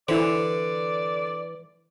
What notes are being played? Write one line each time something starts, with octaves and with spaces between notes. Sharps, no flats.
D3 E3 E4 C5 D5